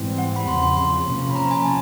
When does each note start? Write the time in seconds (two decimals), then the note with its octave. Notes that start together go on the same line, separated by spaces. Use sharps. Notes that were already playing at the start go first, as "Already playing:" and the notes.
Already playing: G#2 E3 G3 C4
0.18 F#5
0.36 B5
0.47 E2 C#3 F3 C6
0.62 C6
0.77 C6
1.07 C3 F3 A#3 C#4
1.30 B5
1.35 A#5
1.51 G#5
1.65 A5